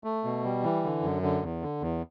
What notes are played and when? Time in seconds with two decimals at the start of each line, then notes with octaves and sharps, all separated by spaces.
0.04 A3
0.24 B2
0.44 G3
0.64 E3
0.84 D3
1.03 F#2
1.23 D3
1.43 E2
1.62 D3
1.82 E2